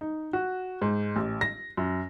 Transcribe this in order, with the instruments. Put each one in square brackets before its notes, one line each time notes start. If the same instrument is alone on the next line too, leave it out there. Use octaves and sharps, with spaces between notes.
[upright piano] D#4
F#4
G#2
A1
A#6
F#2